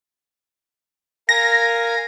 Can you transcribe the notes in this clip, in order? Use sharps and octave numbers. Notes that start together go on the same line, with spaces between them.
A#4 F5 G#5 A#6